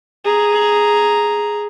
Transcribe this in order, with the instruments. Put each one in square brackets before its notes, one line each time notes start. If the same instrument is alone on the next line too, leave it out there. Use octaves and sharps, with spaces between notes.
[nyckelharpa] G#4 A#5